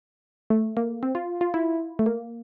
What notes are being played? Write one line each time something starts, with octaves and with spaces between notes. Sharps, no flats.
A3
A#3
C4
F4
F4
E4
A3
A#3